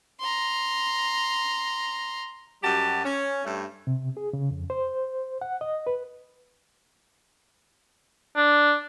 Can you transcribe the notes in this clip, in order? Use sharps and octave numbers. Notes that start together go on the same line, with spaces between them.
A#5 C6
F#2 G3 F#4 G4 A5
C#4
G2 G3 A3
C3
G#4
C#3
F2
C5
F#5
D#5
B4
D4